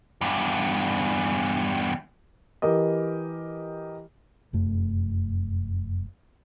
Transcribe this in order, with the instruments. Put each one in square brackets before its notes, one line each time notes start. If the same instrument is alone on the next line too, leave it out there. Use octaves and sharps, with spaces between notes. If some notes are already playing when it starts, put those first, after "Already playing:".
[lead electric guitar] E2 G2
[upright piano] E3 G4 A#4 D#5
[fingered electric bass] F1 F#2 A3